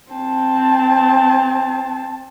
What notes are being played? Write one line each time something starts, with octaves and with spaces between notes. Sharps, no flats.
C4 A5